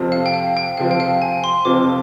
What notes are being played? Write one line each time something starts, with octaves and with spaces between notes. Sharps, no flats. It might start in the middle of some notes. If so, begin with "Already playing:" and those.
Already playing: F2 C3 F3 C4 F4
F5
G5
F5
G5
F2 C3 F3 C4 F4 F5
G5
F5
G#5
C6
F2 C3 F3 C4 F4 D6